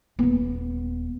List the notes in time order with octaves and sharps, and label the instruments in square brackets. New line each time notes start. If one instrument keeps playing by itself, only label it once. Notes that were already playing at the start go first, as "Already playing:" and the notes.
[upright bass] D#1 B3